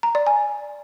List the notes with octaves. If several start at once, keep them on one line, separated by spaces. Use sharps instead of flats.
A#5
D5
G#5